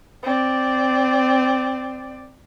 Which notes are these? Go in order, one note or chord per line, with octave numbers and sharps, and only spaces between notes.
C4 D5